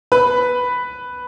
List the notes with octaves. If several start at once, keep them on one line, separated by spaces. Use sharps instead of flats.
B4 B5